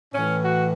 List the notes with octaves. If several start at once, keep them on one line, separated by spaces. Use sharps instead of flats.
A2 E3 C#4
F#4